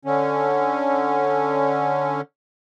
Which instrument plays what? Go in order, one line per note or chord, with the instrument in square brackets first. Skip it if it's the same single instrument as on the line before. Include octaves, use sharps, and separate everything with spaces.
[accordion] D3 C#4